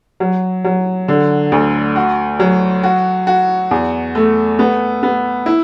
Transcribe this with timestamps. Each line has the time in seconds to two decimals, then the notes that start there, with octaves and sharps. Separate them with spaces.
0.20 F#3
0.64 F#3
1.08 D3
1.52 D2
1.96 F#4
2.40 F#3
2.83 F#4
3.27 F#4
3.71 E2
4.15 A3
4.59 B3
5.03 B3
5.46 E4